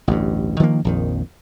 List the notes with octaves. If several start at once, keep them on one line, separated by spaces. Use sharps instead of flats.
A1 D2 G2
D#3 F3 A3 A#3
A#1 F2 D#3